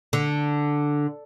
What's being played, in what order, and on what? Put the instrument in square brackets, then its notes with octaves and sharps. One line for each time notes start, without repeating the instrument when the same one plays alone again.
[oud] D3